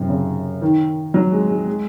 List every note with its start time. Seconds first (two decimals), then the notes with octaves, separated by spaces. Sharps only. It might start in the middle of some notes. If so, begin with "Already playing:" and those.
Already playing: F#2 C3
0.09 C#3
0.62 D#3
1.14 F#3
1.32 G#3
1.50 G#3
1.67 G#3